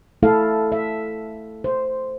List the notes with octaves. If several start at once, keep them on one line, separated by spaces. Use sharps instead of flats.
A3 E4 A4 F5
E5
C5